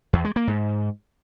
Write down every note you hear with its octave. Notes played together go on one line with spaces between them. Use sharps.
E2
G#3
A#3
G#2